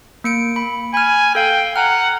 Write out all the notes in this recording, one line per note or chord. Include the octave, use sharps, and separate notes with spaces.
A#3 C#7 D7
B5
G#5 B5 F6
A4 F5 G5
F#5 G#5 A#5 F6